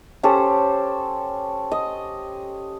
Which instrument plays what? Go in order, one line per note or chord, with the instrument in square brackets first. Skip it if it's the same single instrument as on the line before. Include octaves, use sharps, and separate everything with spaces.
[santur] C#4 G4 A4 C5
D#5